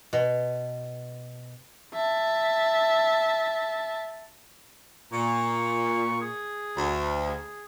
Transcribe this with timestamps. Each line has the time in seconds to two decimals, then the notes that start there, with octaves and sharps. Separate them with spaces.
0.13 B2
1.94 E5 A5
5.13 A#2 C#6
6.21 G#4
6.77 D2
7.27 G#4